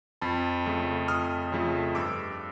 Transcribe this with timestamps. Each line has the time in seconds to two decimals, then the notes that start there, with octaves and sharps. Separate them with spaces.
0.22 F2 A5 B5
0.66 C#3 F3 A3
1.08 F2 D#6 F6
1.52 C#3 F3 A3
1.95 G2 D6 E6